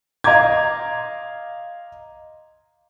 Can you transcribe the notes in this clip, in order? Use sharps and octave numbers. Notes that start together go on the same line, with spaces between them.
D#5 F5 A#5 C6 D6 G#6